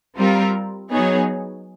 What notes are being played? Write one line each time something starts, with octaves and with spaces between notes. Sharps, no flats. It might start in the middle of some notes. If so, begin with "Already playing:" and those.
G3 C4 F4 A#4
F#3 B3 D#4 G#4 C#5